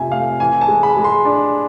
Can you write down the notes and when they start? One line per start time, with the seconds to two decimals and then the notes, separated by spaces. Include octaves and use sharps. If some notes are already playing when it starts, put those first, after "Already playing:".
Already playing: F2 C3 F3 A3 E5 G#5
0.11 A3 F5
0.40 E3 G#5
0.61 A5
0.68 G#3
0.83 B5
0.97 G#3
1.04 C6
1.25 D4